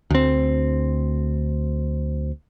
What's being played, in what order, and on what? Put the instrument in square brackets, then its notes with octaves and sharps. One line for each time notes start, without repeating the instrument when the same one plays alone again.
[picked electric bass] D2 C4